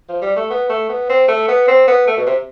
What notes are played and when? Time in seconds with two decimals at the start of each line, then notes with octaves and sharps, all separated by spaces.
0.09 F3
0.22 G3
0.36 A3
0.50 B3
0.69 A3
0.89 B3
1.09 C4
1.28 A3
1.48 B3
1.68 C4
1.88 B3
2.07 A3
2.17 B2
2.26 C3